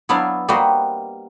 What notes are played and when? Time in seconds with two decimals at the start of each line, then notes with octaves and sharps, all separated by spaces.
0.09 F#3 B3 D4 E4 D5 F5
0.48 G3 A#3 F#4 B4 C5 D#5